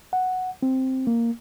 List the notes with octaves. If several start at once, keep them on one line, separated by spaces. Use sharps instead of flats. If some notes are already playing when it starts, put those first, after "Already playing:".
F#5
C4
A#3